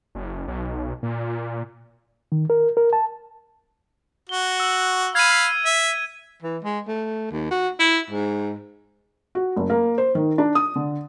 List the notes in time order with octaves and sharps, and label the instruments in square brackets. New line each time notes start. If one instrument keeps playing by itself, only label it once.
[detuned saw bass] F#1
B1
A#2
[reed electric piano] D#3
A#4
A#4
A5
[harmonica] F#4 [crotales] G7
[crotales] E6
[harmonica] F5 B5 [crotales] G#6 D#7
[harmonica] E5
[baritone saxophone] E3
G#3
A3
D#2
F#4
E4
G#2
[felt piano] F#4
F#1
A#3
C5
D#3
D4
D#6
D3